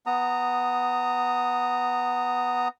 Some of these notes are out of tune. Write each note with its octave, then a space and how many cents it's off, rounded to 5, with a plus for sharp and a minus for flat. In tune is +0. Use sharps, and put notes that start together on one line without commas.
B3 +0 A#5 -20 D#6 +0